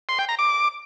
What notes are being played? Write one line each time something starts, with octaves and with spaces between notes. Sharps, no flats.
C6
G5
A#5
D6